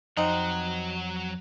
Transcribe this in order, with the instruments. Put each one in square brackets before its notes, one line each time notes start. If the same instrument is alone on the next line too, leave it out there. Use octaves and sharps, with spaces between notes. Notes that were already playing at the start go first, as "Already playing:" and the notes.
[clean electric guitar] F2 [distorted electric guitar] F#3 F#5 [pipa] C4 D#4